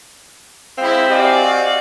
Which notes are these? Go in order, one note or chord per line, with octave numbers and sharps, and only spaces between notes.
G#3 C4 E4 F5
F#4 G4 D5 D#5 F5 G#5